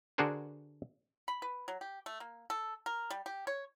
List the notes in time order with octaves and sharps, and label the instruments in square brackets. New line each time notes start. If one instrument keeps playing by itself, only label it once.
[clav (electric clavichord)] D3 D4 F#4 G#4 A#4 C5
[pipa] B5
B4
F#3
G4
A3
A#3
A4
A#4
G3
G4
C#5